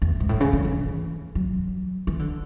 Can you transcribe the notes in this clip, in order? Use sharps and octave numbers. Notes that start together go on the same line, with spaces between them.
E2
G#2
A2
C#3
D3
E3
F#3
E3
D3